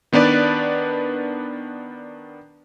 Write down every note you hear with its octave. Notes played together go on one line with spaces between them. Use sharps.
D#3 B3 D4 B4 D5